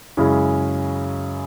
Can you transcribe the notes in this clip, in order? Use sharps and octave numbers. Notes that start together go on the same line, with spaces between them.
F#2 C#3 G#3 C#4 E4